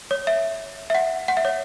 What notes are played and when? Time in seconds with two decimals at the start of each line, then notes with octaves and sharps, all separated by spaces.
0.11 C#5
0.27 E5
0.90 E5
0.95 F#5
1.28 F#5
1.37 E5
1.45 C#5